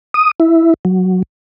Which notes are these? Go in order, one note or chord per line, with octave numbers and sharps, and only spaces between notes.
D#6
E4
F#3